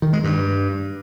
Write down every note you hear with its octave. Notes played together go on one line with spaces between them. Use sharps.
D#3
G#3
G2